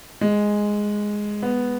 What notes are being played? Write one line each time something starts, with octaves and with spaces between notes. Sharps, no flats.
G#3
B3